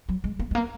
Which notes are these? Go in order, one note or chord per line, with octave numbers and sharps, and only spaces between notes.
F#3
G#3
A#3
G#3
A#3